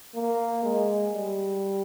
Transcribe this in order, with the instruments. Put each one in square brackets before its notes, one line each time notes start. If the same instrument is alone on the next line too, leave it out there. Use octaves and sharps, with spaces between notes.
[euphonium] A#3
G#3
G3